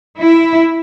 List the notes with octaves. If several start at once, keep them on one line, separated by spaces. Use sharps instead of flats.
E4